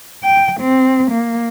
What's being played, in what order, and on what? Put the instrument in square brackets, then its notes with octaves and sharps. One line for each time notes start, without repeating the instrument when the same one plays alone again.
[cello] G5
C4
A#3